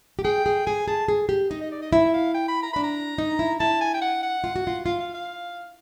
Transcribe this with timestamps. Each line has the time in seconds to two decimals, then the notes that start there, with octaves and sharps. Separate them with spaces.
0.19 G4
0.24 G#4 G5
0.46 G#4
0.66 G#4 G#5
0.88 G#4 A5
1.08 G#4
1.29 G4
1.50 D#4 D#5
1.61 D#5
1.71 D5
1.82 D#5
1.93 E4 E5
2.14 F5
2.34 G5
2.48 B5
2.63 A#5
2.73 D4 B5
2.84 A#5
3.18 D#4
3.39 E4
3.60 E4 A5
3.81 G#5
3.94 G5
4.02 F#5
4.22 F#5
4.44 F4
4.56 F#4
4.67 F4
4.85 F4 F5
5.00 F5
5.14 F5